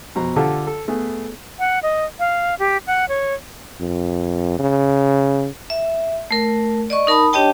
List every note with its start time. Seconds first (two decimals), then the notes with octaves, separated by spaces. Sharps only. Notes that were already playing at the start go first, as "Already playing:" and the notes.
0.15 F2 B2 C5 A#5
0.36 D3 F4 G4 A4 A5
0.67 A4
0.88 A3 B3 G#4
1.59 F#5
1.83 D#5
2.19 F5
2.59 G4
2.87 F#5
3.09 C#5
3.81 F2
4.59 C#3
5.70 E5
6.31 A3 A#4
6.90 D5 D#5 C#6
7.07 D#4 A#4 A5 B5 D#6
7.33 D4 G4 C#5 D#5 G5 A5